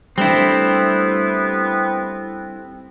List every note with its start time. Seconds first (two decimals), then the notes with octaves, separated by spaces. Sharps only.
0.18 G3 A3 B3 C4 D4 E4